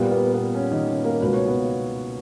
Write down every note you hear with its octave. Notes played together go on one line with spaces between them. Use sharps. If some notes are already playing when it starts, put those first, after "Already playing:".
Already playing: A#2 G3 A#3 B3
B3
B3
C#4
D#3 D#4
C#4
A#3 A#4
C#2 B2 A#3 B4
C#5
B3 B4